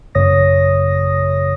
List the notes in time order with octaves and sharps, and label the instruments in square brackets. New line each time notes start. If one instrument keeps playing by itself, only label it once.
[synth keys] A1 F#2 C#3 C#5 D#6 A#6